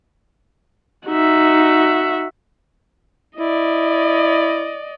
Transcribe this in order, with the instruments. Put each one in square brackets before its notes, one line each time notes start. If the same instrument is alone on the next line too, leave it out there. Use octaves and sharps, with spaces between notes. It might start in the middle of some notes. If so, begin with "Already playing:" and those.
[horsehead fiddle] D#4 [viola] F#4 E5
[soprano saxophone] E4 [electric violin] D5 D#5